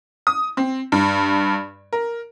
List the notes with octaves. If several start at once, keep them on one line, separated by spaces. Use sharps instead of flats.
D#6
C4
G2
A#4